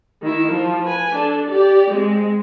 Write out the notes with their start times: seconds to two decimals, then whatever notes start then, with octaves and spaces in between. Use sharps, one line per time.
0.22 D#3 E4
0.52 F3
0.83 B4 G#5
1.15 D4 A4
1.49 G4 D5
1.91 G#3 C4